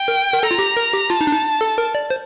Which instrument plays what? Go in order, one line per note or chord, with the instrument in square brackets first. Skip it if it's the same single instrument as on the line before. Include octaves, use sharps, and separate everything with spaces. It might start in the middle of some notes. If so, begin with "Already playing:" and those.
Already playing: [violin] G5
[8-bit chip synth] A#4
A#4
[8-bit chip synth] A4 [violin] A#5
[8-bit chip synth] F4
G4
A#4
G4
[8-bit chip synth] F4 [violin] A5
[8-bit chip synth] D#4
D4
D#4
A4
A#4
D5
C5